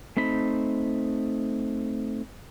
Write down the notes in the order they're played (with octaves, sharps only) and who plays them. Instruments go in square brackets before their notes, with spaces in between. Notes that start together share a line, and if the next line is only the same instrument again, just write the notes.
[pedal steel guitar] A3 C4 D#4 B5